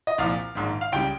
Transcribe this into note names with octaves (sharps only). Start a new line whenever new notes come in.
D#5
C2 A#2 F3 F5
A#1 G#2 D#3
F5
C#2 C#3 G3 G5